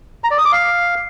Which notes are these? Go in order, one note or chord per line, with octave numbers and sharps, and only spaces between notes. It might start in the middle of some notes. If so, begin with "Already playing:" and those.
A#5
D5
D#6
D6
F5